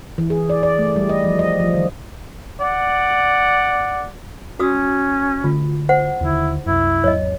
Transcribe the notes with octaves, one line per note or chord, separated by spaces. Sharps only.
E3
G#4
D5
D5
A3
G3
D#5
F3
D#5
F3
D#3
D5 F#5
C#4 F#4 D#6 E6
D3 A3 F4
C5 F#5
D#2 D3 D#3 E4
C2 F#2 E4
G#1 E2 F#3 C#5 D#5